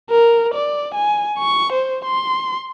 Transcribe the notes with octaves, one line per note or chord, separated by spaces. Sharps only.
A#4
D5
G#5
C#6
C5
C6